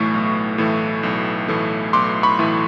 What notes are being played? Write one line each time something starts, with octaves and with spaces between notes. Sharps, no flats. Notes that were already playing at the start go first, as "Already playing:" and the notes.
Already playing: B1 A2 E3 A3 C#6
B1
A2 E3 A3
B1
A2 E3 A3
B1 C6 D6
B5 C#6
A2 E3 A3